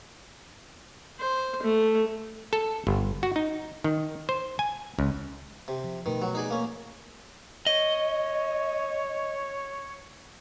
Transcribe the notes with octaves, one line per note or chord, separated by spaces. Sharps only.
C5
A3
A4
G1
F#4
D#4
D#3
C5
G#5
C#2
C3
F3
B2 D#3 A3 B4
F#3
D#4 G#4 D5
A#3 C#4
C#5 D#5